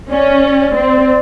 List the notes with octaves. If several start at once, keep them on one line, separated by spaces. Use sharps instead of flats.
C#4 D5
C4